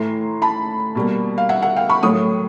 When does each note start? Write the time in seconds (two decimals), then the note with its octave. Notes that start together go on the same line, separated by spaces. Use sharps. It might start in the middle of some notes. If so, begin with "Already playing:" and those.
Already playing: A2 E3 A3 A#5 C6
0.42 A5 B5
0.95 B2 G3 A#3
1.38 F5
1.49 E5 F#5
1.62 E5 F#5
1.76 F5 G5
1.89 B5 C#6
2.03 A2 F#3 A3 C#6 D#6